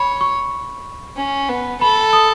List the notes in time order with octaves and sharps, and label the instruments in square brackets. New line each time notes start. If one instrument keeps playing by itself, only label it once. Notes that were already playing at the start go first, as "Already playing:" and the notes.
Already playing: [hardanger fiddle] C#5 [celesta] B5
[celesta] C#6
[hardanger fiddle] C#4
B3
[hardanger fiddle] A4 [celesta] B5
[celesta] D#6